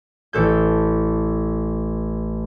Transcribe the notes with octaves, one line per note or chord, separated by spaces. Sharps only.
A1 A4 G6